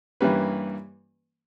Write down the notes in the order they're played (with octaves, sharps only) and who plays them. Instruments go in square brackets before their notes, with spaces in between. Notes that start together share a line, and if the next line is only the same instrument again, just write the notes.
[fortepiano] G2 E3 G3 A#3 C#4 B4